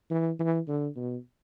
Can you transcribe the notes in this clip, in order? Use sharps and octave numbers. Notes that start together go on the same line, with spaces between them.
E3
E3
D3
B2